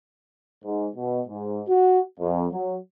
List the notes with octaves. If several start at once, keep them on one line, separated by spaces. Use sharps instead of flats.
G#2
B2
G#2
F#4
F2
F#3